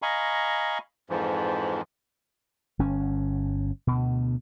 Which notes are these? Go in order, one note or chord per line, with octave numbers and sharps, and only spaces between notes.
D#5 F5 G#5 A#5 B5 C#6
F2 G#2 E3 F3
G1 C#4
D2 B2